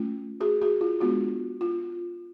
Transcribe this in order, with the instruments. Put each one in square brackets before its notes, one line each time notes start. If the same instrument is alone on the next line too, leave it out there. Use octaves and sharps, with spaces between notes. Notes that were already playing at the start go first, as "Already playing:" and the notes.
Already playing: [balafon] A3 C#4 F4
F#4 G#4
F#4 G#4
F4
G#3 B3 D4 F4 F#4
F4